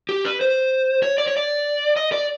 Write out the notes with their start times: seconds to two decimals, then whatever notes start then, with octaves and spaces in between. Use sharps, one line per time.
0.09 G4
0.25 B4
0.41 C5
1.03 C#5
1.18 D5
1.28 C#5
1.37 D5
1.97 D#5
2.12 D5